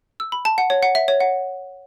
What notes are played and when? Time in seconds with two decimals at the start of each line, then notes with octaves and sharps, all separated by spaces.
0.20 E6
0.32 B5
0.45 A5
0.58 F#5
0.70 C#5
0.83 F#5
0.95 E5
1.08 C#5
1.20 F#5